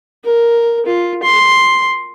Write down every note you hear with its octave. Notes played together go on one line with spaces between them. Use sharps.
A#4
F4
C6